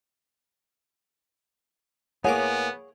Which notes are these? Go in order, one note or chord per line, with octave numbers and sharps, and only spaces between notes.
A2 A#3 B3 G#4 C#5 F#5 G#5 D6